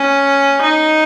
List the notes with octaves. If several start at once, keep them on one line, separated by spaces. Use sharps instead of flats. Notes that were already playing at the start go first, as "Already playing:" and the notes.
Already playing: C#4
D#4